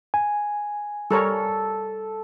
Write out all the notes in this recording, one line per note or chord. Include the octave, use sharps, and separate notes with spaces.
G#5
G3 A4 A#4 C#5